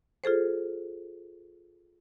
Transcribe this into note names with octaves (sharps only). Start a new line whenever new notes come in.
F4 G#4 A4 C5